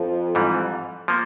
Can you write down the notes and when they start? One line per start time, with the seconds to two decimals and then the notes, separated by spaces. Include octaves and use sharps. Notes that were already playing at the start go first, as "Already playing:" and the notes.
Already playing: F2 F3
0.35 G#2 E3 G3
1.08 F3 A#3